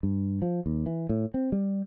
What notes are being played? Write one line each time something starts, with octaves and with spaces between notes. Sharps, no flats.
G2
F3
D#2
E3
A2
C4
G3